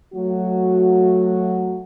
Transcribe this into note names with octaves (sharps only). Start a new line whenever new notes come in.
F#3 A3 F#4